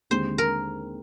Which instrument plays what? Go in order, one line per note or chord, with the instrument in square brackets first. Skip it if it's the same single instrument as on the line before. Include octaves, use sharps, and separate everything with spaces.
[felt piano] D#2 D3 G#3 C4 G4 [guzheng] C5
[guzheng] A#4